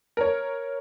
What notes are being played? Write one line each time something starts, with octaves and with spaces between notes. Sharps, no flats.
A#4 C#5